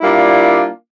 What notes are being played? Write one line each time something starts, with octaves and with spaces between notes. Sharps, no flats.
G3 A#3 D4 E4 F4